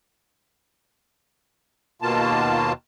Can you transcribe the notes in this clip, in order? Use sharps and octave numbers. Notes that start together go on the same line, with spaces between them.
D#2 B2 A#3 F4 A5